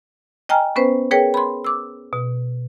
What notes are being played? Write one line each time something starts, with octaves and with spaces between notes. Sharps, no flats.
D#5 G5 G#5 A#5 F6
B3 C#4 B4 C5
G#4 A#4 B4 C#5 G5
B5 C6
D6 E6
B2